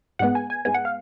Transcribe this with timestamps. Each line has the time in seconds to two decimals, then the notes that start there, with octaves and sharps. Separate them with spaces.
0.19 G#2 G#3 B3 F#5
0.35 G#5
0.50 G#5
0.65 G#2 G#3 B3 G#5
0.74 F#5
0.85 F5